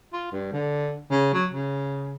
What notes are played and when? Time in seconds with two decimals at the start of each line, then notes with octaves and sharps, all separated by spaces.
0.13 F4
0.32 G2
0.52 D3
1.11 C#3
1.34 F#3
1.51 C#3